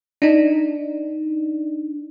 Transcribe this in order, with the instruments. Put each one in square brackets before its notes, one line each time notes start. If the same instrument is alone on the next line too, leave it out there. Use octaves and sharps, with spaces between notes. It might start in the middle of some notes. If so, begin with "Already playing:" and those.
[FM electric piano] D4 D#4